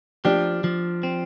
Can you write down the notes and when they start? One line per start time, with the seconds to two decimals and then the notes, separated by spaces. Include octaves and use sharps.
0.25 F3 D4 G4
0.64 F3
1.03 C4